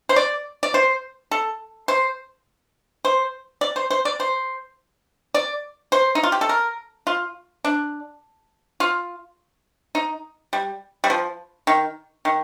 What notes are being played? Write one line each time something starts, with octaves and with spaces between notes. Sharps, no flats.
C5
D5
D5
C5
A4
C5
C5
D5
C5
C5
D5
C5
D5
C5
D#4
F4
G4
A4
A#4
F4
D4
F4
D#4
G3
G3
F3
D#3
D#3